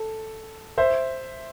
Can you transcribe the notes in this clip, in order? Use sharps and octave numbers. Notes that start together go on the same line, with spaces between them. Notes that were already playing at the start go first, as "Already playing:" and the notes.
Already playing: A4
C5 E5